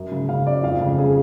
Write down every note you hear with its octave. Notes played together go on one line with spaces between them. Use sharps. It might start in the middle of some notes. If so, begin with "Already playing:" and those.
Already playing: F#2
C#3
C#3 F5
F#2 D5
F2 F5
C#3
C#3 G#4